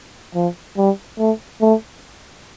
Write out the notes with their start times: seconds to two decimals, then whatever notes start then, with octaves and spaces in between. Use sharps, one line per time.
0.35 F3
0.77 G3
1.19 A3
1.61 A3